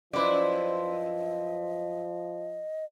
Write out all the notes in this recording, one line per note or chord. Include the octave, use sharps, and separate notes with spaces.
F#2 F3 E4 B4 C5 D5 D#5